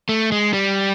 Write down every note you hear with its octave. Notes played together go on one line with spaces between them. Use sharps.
A3
G#3
G3